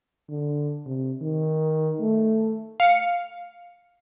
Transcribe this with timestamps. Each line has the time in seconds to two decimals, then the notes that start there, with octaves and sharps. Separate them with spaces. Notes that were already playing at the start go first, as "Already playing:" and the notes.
0.29 D3
0.86 C3
1.21 D#3
2.00 A3
2.80 F5 C#7